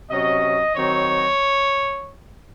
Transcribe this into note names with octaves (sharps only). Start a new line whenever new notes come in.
C3 F#3 C#4 D#5
D#3 F#3 C4 D#4 C#5